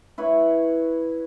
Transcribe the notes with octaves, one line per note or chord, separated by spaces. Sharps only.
E4 B4 C#5